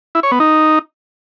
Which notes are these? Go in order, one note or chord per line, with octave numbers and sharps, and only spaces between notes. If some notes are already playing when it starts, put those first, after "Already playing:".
E4
C#5
B3
D#4